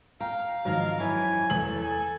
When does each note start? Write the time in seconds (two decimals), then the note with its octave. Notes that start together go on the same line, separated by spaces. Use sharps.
0.21 F5 G5 A#5
0.65 F2 G#2 D#3 F#3 A#4
1.00 F#2 E3 C#5 G#5
1.50 E2 A4 F#7
1.83 G#5